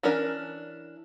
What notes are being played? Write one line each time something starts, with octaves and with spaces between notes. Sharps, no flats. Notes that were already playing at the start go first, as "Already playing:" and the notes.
E3 C#4 D4 A#4